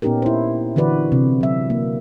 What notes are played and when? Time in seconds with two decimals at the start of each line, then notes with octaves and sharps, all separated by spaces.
0.02 A#2 B3 C#4 D#4 G4 A#4
0.22 E4 C5
0.76 D3 E3 F#4 B4 D5
1.12 C3
1.41 F#3 E5
1.70 A#3